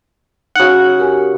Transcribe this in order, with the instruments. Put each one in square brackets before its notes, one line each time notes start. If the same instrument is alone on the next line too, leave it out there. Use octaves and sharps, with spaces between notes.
[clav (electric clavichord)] C#3 F#5 [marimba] D#4 F#4
[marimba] G4 A#4 G#5